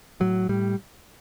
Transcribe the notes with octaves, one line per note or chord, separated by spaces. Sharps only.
A2 F#3
A2 G3